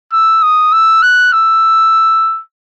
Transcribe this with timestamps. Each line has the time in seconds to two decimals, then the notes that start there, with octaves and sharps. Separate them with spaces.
0.12 E6
0.42 D#6
0.72 E6
1.02 F#6
1.33 E6